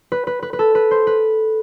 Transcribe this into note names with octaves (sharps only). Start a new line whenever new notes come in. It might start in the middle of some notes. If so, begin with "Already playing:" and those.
B4
B4
B4
B4
A4
B4
C5
B4